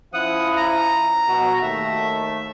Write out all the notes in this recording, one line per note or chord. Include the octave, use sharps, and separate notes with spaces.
F3 C#4 E4 F#5 D#6
A#5
B2 F#4
D#2 A3 E5